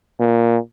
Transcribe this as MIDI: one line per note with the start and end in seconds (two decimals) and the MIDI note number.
0.20 0.57 46